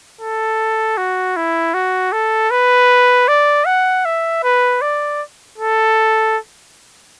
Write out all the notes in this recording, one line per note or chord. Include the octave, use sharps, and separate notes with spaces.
A4
F#4
E4
F#4
A4
B4
D5
F#5
E5
B4
D5
A4